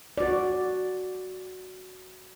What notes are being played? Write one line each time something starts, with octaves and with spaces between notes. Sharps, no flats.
F#4 D5